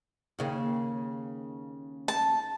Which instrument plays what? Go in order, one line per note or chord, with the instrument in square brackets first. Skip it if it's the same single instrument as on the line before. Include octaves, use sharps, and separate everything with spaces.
[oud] D#2 C#3 A#3
[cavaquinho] A5